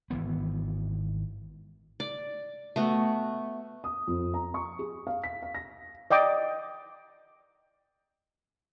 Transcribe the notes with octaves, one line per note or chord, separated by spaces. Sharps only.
G#1 E3 B3
D5
A3 B3 F#4
D#6
F2
A#5
C#6
G#4
F5
B6
F5
A#6
D5 D#5 G5 D6 D#6